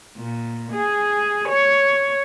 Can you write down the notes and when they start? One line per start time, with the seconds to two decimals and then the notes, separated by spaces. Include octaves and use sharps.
0.17 A#2
0.72 G#4
1.49 C#5